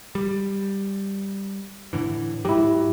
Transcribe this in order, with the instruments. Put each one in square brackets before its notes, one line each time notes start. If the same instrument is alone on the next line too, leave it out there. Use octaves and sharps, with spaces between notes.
[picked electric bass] G3
A2 D3 E3
[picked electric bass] G#2 F#3 [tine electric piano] E4 G4